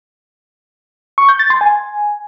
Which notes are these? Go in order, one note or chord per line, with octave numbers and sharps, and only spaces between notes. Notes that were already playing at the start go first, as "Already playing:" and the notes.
C#6
G6
A6
C6
G#5